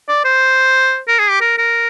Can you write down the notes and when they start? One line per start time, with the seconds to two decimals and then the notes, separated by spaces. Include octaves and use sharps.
0.09 D5
0.24 C5
1.08 A#4
1.19 G#4
1.30 G4
1.41 A#4
1.58 A#4